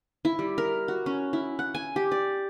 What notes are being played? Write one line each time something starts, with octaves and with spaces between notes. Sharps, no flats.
E4
G3
A#4
F#4
C#4
E4
F#5
G#5
G4
D5